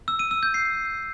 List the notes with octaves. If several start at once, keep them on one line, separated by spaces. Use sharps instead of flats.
E6
D#7
E6
G6
C7